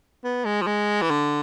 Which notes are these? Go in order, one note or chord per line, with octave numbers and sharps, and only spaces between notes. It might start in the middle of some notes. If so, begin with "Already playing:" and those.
B3
G#3
F3
G#3
E3
D3